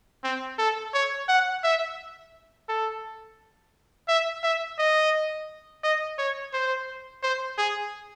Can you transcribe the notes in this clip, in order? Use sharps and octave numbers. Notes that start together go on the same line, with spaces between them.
C4
A4
C#5
F#5
E5
A4
E5
E5
D#5
D#5
C#5
C5
C5
G#4